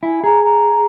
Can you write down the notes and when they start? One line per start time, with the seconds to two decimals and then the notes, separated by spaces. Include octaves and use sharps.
0.03 E4 G#5
0.24 G#4 A#5
0.44 A#5